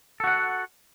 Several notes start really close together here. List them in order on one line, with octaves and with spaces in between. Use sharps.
A4 F#4 F#5